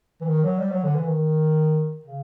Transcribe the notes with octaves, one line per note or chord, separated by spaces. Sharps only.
E3
D#3
F#3
G3
F#3
D3
E3
D#3
C#3